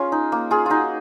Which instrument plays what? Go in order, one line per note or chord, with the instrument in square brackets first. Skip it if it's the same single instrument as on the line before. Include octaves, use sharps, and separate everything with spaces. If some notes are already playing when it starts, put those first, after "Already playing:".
Already playing: [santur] C#4 F4 G#4
D#4
A#3
F4 G#4
D#4 F4 F#4